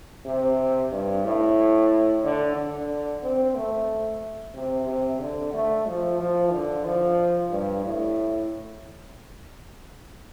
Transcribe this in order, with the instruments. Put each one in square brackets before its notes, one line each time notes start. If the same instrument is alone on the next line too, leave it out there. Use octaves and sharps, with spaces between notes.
[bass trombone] C3
G2
A2
D3
D3
C4
A3
C3
C3
D3
A3
F3
F3
D3
F3
G2
A2